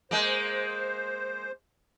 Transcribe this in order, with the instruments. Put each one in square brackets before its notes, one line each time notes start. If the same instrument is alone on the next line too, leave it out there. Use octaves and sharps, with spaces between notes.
[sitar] G#3 A#3 [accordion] C5